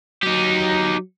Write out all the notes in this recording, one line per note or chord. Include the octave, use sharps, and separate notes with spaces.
F#3 D#4 G4